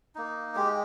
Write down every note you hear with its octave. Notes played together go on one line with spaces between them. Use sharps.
A#3 D#4
G#3 G4